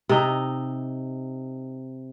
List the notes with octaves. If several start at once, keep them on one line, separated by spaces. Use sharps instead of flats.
C3 D#4